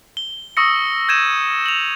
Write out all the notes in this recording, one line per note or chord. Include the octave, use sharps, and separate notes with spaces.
G7
C#6 D#6 E6 A#6 C#7
G6 G#6 D#7 E7
F7 F#7